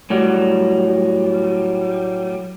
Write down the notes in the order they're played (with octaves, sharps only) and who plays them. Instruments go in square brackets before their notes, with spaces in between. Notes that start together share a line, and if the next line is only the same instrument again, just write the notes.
[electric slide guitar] A2 F#3 G3